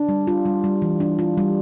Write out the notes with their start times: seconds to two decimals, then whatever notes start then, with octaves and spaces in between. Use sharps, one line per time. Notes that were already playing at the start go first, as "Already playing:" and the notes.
Already playing: D4
0.09 G3
0.27 F4
0.45 G3
0.64 G3
0.82 E3
1.00 D4
1.19 F4
1.38 G3